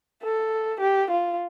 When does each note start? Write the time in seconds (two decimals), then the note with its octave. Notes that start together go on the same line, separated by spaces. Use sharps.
0.23 A4
0.80 G4
1.10 F4